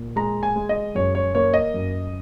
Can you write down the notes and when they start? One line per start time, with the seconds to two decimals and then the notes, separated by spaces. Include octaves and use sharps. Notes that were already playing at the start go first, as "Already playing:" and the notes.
Already playing: A#2
0.16 G#3 A#5
0.43 G#5
0.56 G#3
0.69 D#5
0.95 F#2 C#5
1.15 C#5
1.35 A#3 C#5
1.54 D#5
1.74 F#2